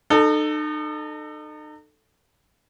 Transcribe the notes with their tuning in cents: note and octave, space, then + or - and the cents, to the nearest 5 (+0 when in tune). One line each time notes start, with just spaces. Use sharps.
D#4 -40 A4 +0